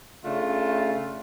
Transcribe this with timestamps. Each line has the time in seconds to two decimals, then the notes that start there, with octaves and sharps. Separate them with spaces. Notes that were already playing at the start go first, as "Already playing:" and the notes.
0.23 C#3 A3 D4 F4